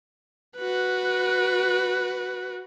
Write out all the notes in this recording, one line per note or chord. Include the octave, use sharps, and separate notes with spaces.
F#4 B4